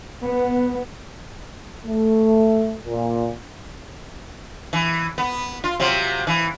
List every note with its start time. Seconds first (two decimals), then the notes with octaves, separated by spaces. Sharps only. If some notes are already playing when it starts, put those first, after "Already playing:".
0.23 B3
1.85 A3
2.85 A#2
4.73 E3
5.18 B3
5.64 F4
5.80 C3 F#3 F4
6.27 E3